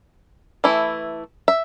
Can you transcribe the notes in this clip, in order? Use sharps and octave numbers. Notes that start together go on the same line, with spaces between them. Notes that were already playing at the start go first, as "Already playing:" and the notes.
E3 A3 E4
E5